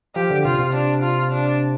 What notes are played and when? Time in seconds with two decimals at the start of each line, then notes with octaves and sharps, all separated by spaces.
0.15 F3 G4
0.30 D3
0.45 C3 F4
0.59 C3
0.73 D4
1.02 F4
1.32 D4